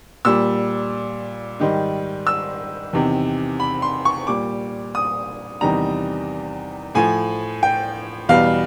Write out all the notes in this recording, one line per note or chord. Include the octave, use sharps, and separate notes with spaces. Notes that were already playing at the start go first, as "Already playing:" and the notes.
A#2 G3 E6
G#2 D#3 G3
E6
E2 C3 D#3
B5
C6
C#6
A#2 G3 D6
D#6
E2 C3 D#3 G3 A#5
A2 F3 G#5
G5
E2 B2 G3 F5